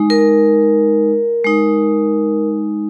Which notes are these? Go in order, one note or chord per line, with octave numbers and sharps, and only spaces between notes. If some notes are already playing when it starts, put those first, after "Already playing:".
Already playing: G#3 D#4
A#4
G#3 D#4